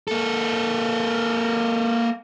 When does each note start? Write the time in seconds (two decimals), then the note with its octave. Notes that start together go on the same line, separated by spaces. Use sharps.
0.08 A#3 A4